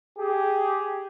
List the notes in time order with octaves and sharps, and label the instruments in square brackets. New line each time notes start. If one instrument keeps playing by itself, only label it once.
[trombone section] G4 G#4